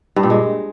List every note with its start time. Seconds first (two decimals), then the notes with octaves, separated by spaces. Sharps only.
0.16 G2
0.23 A#2
0.30 G#3